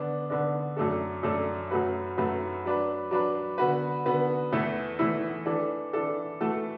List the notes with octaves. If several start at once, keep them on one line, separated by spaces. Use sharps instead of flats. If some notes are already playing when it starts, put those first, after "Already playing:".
Already playing: D3 B3 D4
D3 B3 D4
F#2 F#3 A3 D4 A4
F#2 F#3 A3 D4 A4
F#2 F#3 A3 F#4 B4
F#2 F#3 A3 F#4 B4
F#3 D4 B4
F#3 D4 B4
D3 B3 F#4 B4
D3 B3 F#4 B4
E2 E3 A3 E4 A4
E2 E3 A3 E4 A4
E3 D4 A4
E3 D4 A4
E3 A3 F#4 A4